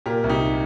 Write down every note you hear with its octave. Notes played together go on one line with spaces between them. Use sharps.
A#2 G4 A#4
C2
D#4 G4